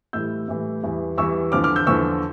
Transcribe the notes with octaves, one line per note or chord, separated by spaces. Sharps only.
A2 E3 G3 E6 G6
A2 E3 G3
E2 E3 G3
E2 E3 G3 C#6 E6
E2 D3 F3 D6 F6
D6 F6
E6 G6
E2 D3 F3 C#6 E6